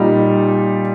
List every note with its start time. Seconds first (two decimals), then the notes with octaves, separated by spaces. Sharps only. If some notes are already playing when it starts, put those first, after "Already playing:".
Already playing: A#2 G3 D#4